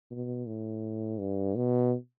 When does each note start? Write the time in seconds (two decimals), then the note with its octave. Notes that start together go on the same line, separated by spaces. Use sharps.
0.11 B2
0.46 A2
1.19 G2
1.56 B2